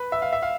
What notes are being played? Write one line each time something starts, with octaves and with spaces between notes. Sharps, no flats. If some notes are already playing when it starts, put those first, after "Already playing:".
Already playing: B4
E5
F5
E5
F5